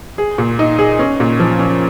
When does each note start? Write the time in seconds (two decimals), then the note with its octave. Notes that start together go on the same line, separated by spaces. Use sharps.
0.18 G#4
0.38 A#2
0.59 D#4
0.79 G#4
0.99 C#4
1.20 A#2
1.40 F3
1.59 C#4